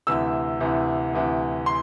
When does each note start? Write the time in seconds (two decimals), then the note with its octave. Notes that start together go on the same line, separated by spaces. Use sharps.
0.07 D2 C3 E3 E6
0.60 D2 C3 E3
1.13 D2 C3 E3
1.66 C6